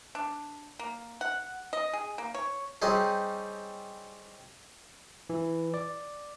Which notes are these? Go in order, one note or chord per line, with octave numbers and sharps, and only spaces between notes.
D4
A#3
F#5
D#5
G#4
A#3
C#5
G3 C4 C#4 D#4 G#4
E3
D5